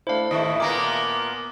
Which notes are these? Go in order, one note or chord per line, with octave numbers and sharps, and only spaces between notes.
A3 D4 E4 C5 F5
D#2 A2 E4 D#5 A5 C#6
A#2 A#3 B3 A#4 G#5 D6 A#6